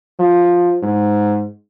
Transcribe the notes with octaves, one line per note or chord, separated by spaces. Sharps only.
F3
G#2